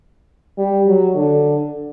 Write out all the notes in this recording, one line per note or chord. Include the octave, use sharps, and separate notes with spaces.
G3
F#3
D3